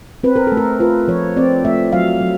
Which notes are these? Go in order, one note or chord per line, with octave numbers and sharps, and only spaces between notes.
C4 B4
A#4
A3 A4
A#4
F4 B4
F3 C#5
C4 D5
A3 E5
F#3 F5
F#3